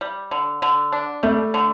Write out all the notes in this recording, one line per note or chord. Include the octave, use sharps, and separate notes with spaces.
G3
D3
D3
D4
G3 A3
D3